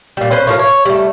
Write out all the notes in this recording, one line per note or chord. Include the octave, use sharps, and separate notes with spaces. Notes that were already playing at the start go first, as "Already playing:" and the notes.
A#2 G3
C#4 B4 C5
A2 F3 A#4
C#5
G3 A3